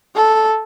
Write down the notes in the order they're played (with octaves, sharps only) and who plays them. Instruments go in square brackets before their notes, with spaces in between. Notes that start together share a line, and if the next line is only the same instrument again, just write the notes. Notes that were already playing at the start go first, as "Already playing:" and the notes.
[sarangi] A4